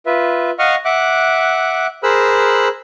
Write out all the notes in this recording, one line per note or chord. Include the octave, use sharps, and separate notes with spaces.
F4 B4 E5
D#5 F5 F#5 C#6 D#6 F6
E5 F#5 D6 F#6
G#4 A#4 C5 B5 E6 F#6